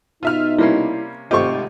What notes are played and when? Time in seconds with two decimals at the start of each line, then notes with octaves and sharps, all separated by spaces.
0.23 B2 D#4 F4 E5 F6
0.58 C3 G3 A#3 C#4 E4 C7
1.31 G#1 C3 A3 F4 G4 C5 D#5 C#6